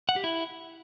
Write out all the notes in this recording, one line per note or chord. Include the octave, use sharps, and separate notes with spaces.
F#5
G4
E4